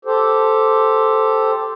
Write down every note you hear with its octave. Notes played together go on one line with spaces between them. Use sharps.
G4 A4 C5